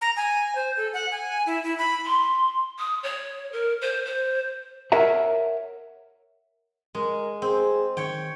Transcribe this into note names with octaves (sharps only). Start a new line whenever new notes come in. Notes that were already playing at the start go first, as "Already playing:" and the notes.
A#5
G#5
C5
A4
F#5
G#5
E4
E4
B5
C6
D#6
C#5
A#4
C5
C5
A#4 C#5 E5 F#5 A#5
G#3 A#4
C4 G#4
D#3 C#5 G5